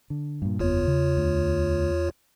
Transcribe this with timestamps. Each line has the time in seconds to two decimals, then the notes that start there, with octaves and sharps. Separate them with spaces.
0.10 D3
0.42 G2 A#2
0.59 F#1 E2 B3 F4 C#5
0.87 C#3
1.17 D2